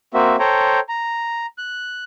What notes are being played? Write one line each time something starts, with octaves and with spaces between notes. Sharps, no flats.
A#3 C4 F#4 E5
A4 C5 C#5 G5 A#5
A#5
F#6